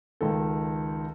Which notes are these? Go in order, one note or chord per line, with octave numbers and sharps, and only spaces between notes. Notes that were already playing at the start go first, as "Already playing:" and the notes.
C#2 D#3 A4